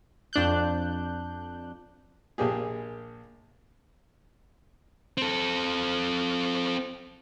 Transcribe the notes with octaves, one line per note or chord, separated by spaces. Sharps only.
F2 D4 F#6 G6
A#1 A#3 G4 G#4
C4 A4